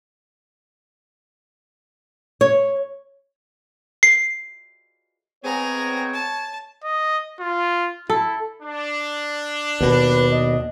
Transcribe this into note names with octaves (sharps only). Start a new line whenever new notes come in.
C#5
C7
G#3 B3 C4 G#4 C#5 A#5
A5
D#5
F4
E4 A4
D4
D#2 B2 B4
D#5